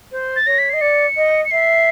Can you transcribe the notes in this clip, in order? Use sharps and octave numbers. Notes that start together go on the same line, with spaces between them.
C5
A6
C#5 A#6
B6
D#5 C7
D5 C#7
D#5
C#7
E5 C7